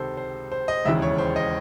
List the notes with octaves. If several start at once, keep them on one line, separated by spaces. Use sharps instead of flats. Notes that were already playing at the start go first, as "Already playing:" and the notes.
Already playing: C#2 C3 D#3 A4 C5
C5
C5
D#5
E1 D#2 C#3 E3 E5
C#5
C5
D#5